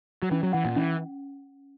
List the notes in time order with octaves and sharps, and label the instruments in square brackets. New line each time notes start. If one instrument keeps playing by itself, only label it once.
[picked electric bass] F#3
[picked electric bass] E3 [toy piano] C#4
[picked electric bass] F#3
[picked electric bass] E3 [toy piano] F#5
[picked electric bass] A#2
[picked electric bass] E3 [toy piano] C#4